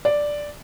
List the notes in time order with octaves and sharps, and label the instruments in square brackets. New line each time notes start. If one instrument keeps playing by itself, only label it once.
[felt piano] D5